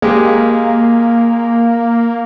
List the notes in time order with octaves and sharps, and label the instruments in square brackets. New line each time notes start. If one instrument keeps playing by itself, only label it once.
[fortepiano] G#3 G4 [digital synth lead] A#3